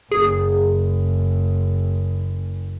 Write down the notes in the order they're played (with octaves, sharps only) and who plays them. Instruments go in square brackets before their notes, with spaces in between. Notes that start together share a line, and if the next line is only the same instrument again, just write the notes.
[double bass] F#1 [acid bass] G#4